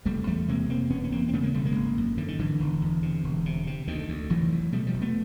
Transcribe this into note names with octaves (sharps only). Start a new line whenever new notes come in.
F1 G3 A3
E2 G3 A3
C3 G#3 A#3
F1 A#3 C4
E1 B3 C#4
C#4
E2 A#3 C4
C4
C#3 A3 B3
G#3 A#3
E1 G3 A3
G#3 A#3
G#1
F#2
D3 E3
D#3
G#1 D3 E3
E1
E2
C3
E1
C3
C3
D2 D#3
D2
F1 E3 F#3
E2
B2 G3 A3
F3 G3
F1
A3 B3